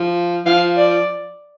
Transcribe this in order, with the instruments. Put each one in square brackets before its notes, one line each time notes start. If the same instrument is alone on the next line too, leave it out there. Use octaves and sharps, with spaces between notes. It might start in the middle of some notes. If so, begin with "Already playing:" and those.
Already playing: [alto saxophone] F3
[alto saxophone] F3 [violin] F5
[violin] D5